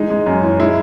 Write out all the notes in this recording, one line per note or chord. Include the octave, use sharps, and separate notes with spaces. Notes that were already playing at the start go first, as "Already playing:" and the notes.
Already playing: E3 G#3 D#4
G#3
F#2
E3
G#3 E4